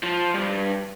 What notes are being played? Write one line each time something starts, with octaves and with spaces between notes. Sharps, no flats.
F3
G2